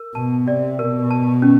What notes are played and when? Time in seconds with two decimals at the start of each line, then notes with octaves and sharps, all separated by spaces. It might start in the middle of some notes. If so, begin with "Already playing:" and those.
Already playing: A#4
0.15 B2 A5
0.46 C3 D5
0.78 B2 A#4
1.11 A5
1.42 C#4